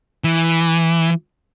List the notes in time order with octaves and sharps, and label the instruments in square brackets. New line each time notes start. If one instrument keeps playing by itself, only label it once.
[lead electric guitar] E3